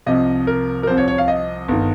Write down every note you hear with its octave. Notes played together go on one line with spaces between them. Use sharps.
C2 C3 F3 D#5
A#4
A#4
C2 C3 F3 C4 C5
C#5
C#5
F5
D#5
G1 D#3